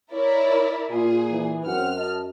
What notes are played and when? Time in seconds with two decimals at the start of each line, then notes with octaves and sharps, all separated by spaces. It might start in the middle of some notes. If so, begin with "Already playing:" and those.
0.12 E4 A#4 C#5 D5
0.90 A#2 F4 G#4
1.31 E3
1.66 F#2 C4 C#4 F#5 F6
1.96 D#5 A5